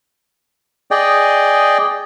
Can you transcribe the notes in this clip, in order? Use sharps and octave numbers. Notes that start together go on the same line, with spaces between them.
G#4 D5 D#5 G5